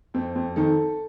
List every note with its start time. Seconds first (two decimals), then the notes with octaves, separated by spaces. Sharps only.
0.14 F2 C4
0.35 F2
0.56 D#3 A4